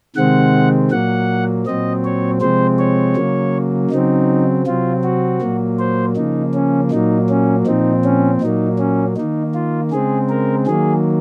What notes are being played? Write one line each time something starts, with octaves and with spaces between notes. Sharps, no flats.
C3 D#3 G#3 C4 F#5
A#2 F#3 A#3 F#5
A#2 F#3 C4 D#5
C#5
C3 F3 G#3 C4 C5
C#5
C#3 F#3 A#3
C#3 F#3 C4 D#4
C3 F#3 C4 F4
F#4
A#2 F#3 A#3
C5
C#3 F3 A#3 D#4
C#4
A#2 F#3 A#3 D#4
C#4
A#2 F3 C4 D#4
C#4
A#2 F#3 A#3 D#4
C#4
D#3 A#3 D#4
F4
C#3 G#3 C4 G#4
A#4
D#3 F#3 A#3 G#4